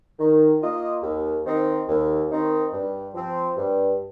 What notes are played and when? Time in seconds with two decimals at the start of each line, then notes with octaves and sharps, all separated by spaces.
0.19 D#3
0.62 A#3 F4 D#5
1.03 D#2
1.46 D#3 C4 D#4
1.88 D#2
2.31 D#3 C4 D#4
2.72 G2
3.15 F3 C4
3.57 G2